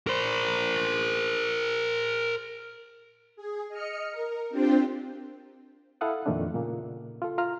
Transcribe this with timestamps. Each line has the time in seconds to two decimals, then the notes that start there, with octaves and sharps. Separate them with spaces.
0.07 A#4 C5
3.36 G#4
3.69 D#5 F6 C#7
4.11 A#4
4.50 C4 D4 F4 G4 C5 G5
6.01 E4 A4 F5 F#5 D#6
6.26 F2 A#2 D#3 A3 C4 D4
6.54 A#2 C#3 A#3
7.22 F4 A4
7.38 F4 A#5 F6